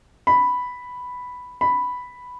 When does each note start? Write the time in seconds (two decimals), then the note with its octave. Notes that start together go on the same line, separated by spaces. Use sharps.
0.27 B5
1.61 B5